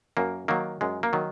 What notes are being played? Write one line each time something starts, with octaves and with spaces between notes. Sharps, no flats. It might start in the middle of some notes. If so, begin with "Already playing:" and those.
F#2 A#3
D#3 F#3 A#3
F#2 G#3
A#3
D#3 F#3